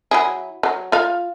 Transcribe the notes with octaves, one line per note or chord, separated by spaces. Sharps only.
F#3 E4 G#4
F#3
F4 F5